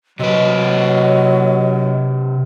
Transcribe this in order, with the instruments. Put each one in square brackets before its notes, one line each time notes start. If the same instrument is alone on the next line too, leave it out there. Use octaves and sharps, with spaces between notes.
[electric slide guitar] C3 B4 [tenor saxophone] F#3 [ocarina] D#5